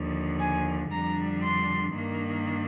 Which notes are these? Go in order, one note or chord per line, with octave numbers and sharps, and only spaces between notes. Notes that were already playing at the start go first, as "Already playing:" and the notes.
Already playing: D#2 D3 F3
G#5
F2 D3 G3 D4 A#5
C6
G2 D#3 A#3 D4